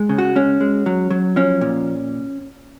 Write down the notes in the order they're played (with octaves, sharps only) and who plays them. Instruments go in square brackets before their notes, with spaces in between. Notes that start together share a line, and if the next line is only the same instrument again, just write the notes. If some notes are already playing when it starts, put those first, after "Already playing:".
Already playing: [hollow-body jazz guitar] G#3
C#3
F#4
G#3 C#4
G#3
F#3
F#3
F3 C#4
A#2